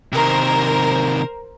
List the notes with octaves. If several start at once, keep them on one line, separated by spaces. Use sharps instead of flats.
C3 D#3 A#4 C5